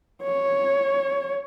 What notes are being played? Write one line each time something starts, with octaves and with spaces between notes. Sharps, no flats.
C#5